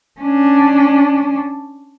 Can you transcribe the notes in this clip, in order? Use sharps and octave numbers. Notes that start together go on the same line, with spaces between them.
C#4 D4